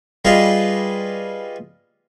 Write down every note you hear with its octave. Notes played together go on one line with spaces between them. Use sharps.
G3 F4 G#4 B4 D#5 F5